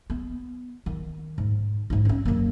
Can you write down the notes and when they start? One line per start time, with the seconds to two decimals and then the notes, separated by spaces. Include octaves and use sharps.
0.10 B3
0.86 D#3
1.38 G#2
1.90 G#2 D#4
2.05 C#4 D4
2.25 F#2 A#3